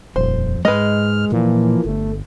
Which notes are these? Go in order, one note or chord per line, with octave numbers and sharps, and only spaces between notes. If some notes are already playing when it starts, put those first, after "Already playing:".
D#1 F2 C5
G#2 G#3 B4 D#5 F6
A#2 E3 F3 A#3
G1 A3